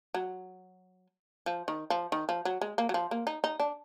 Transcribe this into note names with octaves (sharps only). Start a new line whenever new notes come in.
F#3
F3
D#3
F3
D#3
F3
F#3
G#3
A#3
F#3
F3
A#3
D#4
D#4
D4